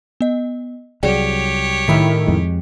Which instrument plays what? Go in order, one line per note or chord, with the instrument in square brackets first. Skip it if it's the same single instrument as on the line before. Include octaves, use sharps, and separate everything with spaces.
[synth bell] B3 D#5
[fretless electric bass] C2 F#3 [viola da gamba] G4 C#5 [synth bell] G#4 D5 G5
[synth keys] A2 D#3 E4 [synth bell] G5 B6
[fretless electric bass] F2 G#3